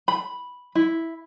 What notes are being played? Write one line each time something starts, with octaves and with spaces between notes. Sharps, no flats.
B5
E4